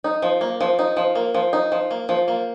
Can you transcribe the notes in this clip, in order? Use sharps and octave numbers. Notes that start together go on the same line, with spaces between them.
D#4
F3
A#3
F3
D#4
F3
A#3
F3
D#4
F3
A#3
F3
A#3